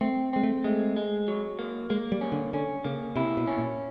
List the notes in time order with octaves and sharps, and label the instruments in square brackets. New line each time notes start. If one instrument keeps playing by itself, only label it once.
[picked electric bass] A3 [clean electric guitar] C4
[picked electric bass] G#3 [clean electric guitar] C4
[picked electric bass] A3
[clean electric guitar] G#3 [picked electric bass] A3
[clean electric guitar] G#3
F#3
A#3
[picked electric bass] G#3 [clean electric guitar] A#3
[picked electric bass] G3
[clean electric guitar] C#4
[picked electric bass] D3
[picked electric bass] D3 [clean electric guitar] C#4
[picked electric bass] C#3 [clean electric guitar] A#3
[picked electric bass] C3 [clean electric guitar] E4
[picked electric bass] B2
[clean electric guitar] C#4
[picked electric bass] A#2